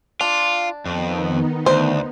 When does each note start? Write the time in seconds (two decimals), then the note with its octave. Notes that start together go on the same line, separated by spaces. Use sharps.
0.21 D4 F4
0.85 F2 D#3 B3 D#4
1.66 D2 C5